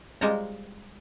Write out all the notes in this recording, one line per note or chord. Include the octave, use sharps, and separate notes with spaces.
G3 G#3 F4 C5 A#5